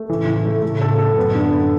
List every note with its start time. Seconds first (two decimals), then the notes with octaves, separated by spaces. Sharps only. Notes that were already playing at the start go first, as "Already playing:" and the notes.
Already playing: A3
0.09 A2 C#3 E3
0.27 E3
0.45 A3
0.62 A2 C#3 A3
0.81 A4
0.98 A4
1.16 F#2 A2 B3
1.35 D3
1.52 B3